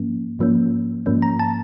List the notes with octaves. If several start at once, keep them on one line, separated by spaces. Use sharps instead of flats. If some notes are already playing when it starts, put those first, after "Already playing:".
Already playing: G#2 F3 A#3 C#4
G#2 F3 A#3 C#4
G#2 F3 A#3 C#4
A#5
A5